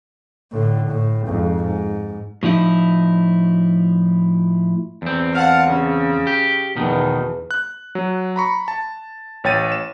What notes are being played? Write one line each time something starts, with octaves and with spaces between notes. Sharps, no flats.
A2 D3
A2
F2 G#2
G#2
A2 F3 D#4 E4
E2 C4
F5 F#5 A5
C#3
G4
E2 B2 D#3
F#6
F#3
A#5 B5 C#6
A5
A1 C#5 G5 A6 D#7
E7